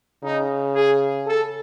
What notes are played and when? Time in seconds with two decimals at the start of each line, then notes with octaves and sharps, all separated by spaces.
0.23 C#3 D#4
0.75 G#4
1.27 A4